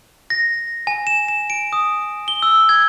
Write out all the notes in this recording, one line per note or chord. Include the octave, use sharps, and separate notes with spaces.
A#6
G#5
E7
E7
D7
D#6
G7
E6
G#6